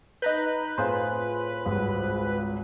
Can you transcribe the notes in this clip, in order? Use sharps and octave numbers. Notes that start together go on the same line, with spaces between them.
D#4 B4 A#5 G6
A2 C4 F4 G#4 C5
G#1 C#2 G3